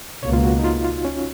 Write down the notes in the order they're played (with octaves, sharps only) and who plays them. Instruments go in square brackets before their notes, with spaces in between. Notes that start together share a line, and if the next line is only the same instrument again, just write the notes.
[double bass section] C#2 B2 A#3 [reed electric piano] C#5
[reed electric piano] F4
F#4
D#4
F4
F4
C#4